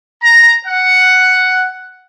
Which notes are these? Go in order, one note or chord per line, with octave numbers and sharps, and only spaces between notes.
A#5
F#5